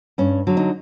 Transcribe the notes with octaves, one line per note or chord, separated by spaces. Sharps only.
G2 C#4
D3 F#3
D#4